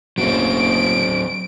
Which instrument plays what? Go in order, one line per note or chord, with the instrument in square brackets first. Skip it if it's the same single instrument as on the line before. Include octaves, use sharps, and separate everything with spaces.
[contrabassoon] F#1 [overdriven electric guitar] F#3 C4 [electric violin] D7